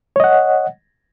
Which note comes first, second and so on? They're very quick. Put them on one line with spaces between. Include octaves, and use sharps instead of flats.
C#5 D#5 F#5